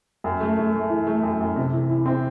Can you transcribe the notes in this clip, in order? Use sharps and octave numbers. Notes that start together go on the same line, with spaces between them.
F#2
A3
A3
A3
E3
A3
F#2
F#2
C3
E3
E4
C4